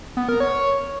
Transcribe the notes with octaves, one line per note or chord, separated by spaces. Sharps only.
B3
A#4
C#5